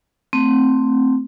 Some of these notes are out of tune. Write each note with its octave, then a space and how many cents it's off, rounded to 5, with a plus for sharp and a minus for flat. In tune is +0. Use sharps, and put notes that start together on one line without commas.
A3 +20 C4 +0